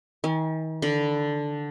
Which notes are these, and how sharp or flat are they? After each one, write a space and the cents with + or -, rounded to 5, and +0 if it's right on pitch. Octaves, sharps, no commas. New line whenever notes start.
D#3 +40 G#5 +0
D3 +0 B5 +0